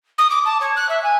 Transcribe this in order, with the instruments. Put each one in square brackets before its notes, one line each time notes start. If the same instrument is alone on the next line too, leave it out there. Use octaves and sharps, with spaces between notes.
[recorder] D#6
D6
A5
C#5
F#6
E5
G#5